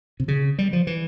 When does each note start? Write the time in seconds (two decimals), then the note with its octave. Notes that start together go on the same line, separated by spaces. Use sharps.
0.20 C3
0.28 C#3
0.59 G3
0.73 F3
0.87 E3